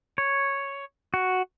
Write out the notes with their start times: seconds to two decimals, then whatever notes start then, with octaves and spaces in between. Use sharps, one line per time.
0.18 C#5
1.14 F#4